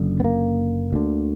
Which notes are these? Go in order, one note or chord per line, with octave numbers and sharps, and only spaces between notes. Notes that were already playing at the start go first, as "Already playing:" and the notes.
Already playing: F#1 F#2 D3
B3
A#3
D2 D3